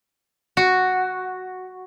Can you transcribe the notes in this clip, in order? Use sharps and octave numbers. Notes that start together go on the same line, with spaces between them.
F#4